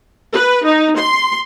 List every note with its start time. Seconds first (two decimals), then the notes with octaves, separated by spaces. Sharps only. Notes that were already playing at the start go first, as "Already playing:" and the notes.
0.34 B4
0.65 D#4
0.98 C6